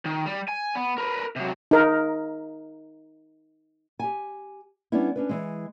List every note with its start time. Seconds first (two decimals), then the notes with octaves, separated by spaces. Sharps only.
0.05 D#3
0.26 G3
0.48 G#5
0.75 B3
0.98 A#4 B4
1.36 C3 F#3
1.71 D#4 A#4
3.99 G4 G#5
4.92 G3 B3 C#4 D4 E4
5.16 C#4 D4 B4
5.29 E3 G#3